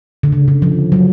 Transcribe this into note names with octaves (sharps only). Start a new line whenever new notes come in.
D3
C#3
D3
F3
F#3